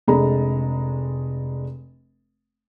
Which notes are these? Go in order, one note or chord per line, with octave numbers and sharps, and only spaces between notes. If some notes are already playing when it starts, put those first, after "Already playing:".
F1 G#3 D4 A4 A#5 B5